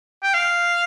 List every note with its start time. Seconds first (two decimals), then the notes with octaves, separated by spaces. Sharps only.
0.23 G5
0.34 F5